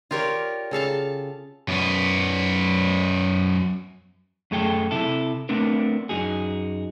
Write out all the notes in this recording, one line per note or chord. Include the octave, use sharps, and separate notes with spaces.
F4 G4 A#4 C#5 D5
C#3 A4 F5 A5
F#2 B3
F#2 A3 G#4 A4 G5
C3 E4 A4
A3 B3 C4 D4 A#4
F#2 D#4 F#4 G#4